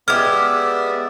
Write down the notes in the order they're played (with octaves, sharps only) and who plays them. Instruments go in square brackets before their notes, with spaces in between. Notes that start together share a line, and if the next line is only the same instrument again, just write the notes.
[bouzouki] G#3 G4 [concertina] B3 D5 E5 [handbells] F6